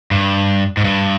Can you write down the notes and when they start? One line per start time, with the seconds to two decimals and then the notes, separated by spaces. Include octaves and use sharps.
0.11 G2
0.77 G#2
0.84 G2